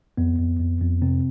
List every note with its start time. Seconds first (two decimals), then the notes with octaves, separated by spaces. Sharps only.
0.17 F2 B3
0.39 F2
0.60 F2
0.81 F2
1.02 C3 C4